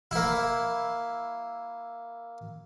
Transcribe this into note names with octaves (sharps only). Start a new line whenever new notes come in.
A#3 E4